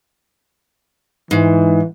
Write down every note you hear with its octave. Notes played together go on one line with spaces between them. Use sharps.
G#2 E3